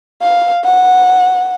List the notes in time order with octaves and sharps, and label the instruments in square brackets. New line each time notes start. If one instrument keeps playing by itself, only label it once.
[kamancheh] F5
F#5